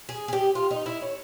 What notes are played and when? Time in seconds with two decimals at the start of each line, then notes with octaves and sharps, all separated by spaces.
0.09 G#4
0.28 G#4
0.33 G4
0.55 F4
0.71 D#4
0.86 E4
1.02 C#4